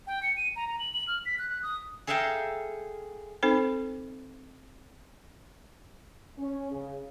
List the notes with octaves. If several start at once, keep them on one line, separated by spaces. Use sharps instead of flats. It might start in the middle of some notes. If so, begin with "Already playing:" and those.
G5
C#7
D#7
A#5
A#5
F#7
F#7
F6
B6
F#6
F#6
D#6
G#4 A4 E5 F5 G5 A#5
C4 D#4 A4 C5 B5
C#4
C#3